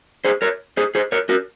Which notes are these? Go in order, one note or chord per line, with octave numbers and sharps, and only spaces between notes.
G#4 C5
A#4 C#5
G#4 C5
G#4 C5
A#4 C#5
F#4 A#4